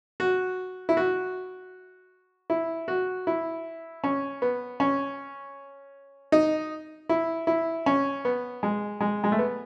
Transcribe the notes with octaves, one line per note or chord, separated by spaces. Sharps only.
F#4
E4
F#4
E4
F#4
E4
C#4
B3
C#4
D#4
E4
E4
C#4
B3
G#3
G#3
G#3
A3
B3